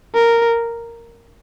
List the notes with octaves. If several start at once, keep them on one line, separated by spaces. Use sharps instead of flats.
A#4